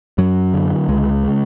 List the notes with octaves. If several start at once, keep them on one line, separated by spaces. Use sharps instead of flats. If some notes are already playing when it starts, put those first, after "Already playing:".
F#2 F#3
D3
C#2 G#3
C#3